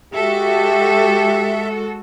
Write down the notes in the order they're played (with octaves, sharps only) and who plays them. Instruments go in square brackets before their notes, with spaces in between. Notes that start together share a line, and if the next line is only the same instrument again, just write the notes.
[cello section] G#3 F#4 A4 [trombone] G4 [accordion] E5